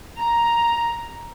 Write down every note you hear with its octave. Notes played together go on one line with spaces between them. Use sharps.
A#5